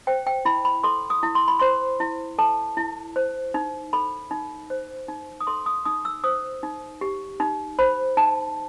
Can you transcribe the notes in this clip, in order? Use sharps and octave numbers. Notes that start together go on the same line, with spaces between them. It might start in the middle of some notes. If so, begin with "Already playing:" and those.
C5 G5
G5
E4 B5
B5
A4 C6
D#6
E4
C6
B5
C5 C6
E4
A4 A5
E4
C5
D#4
A4 B5
D#4
C5
D#4
D#6
A4 C6
D#6
D#4 D#6
E6
C5 D#6
D#4
G4
D#4
C5 B5
D#4 A5